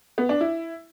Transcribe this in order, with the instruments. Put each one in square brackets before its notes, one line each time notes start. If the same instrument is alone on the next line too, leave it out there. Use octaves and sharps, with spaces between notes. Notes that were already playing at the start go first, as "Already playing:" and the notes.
[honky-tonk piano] B3
D4
E4